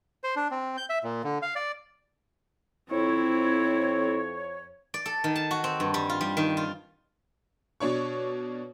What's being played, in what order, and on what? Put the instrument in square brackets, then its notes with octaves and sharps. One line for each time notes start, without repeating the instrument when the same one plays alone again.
[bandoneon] C5
D4
C4
G6
E5
A#2
D3
F5
D5
[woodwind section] F2 C#5 [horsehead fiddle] C4 E4
[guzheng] D5
A4
D#3
A5
F#4
C4
G2
G3
F4
G3
D#3
F4
[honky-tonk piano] B2 D4 C#5 C#6